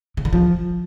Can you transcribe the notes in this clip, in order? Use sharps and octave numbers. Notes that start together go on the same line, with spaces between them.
C#3
D3
F3